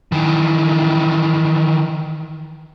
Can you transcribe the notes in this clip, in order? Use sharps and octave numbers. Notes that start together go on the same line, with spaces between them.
D#3 E3